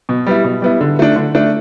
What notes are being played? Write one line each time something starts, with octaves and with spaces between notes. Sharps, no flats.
B2
G3 B3 E4
B2
G3 B3 E4
D3
A3 D4
D3
A3 D4